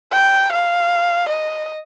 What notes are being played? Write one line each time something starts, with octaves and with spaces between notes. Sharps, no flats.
G5
F5
D#5